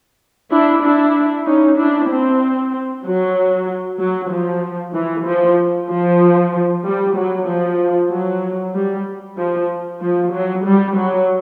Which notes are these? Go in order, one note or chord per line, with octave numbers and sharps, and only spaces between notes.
D4 E4
D4 E4
C#4 D#4
D4 E4
C4
F#3
F#3
F3
E3
F3
F3
G3
F#3
F3
F#3
G3
F3
F3
F#3
G3
F#3